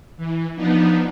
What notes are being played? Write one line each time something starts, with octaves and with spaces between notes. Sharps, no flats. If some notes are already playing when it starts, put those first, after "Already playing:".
E3
F3 B3 D4 D#4